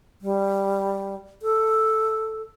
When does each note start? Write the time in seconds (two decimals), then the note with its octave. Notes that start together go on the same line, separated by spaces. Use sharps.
0.21 G3
1.42 A4